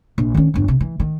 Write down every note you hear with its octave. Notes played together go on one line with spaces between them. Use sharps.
A#1
D#3 C#4
G1 F2
C3
E3
D#3